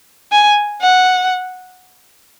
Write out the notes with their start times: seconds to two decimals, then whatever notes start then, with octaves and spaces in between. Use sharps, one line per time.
0.32 G#5
0.82 F#5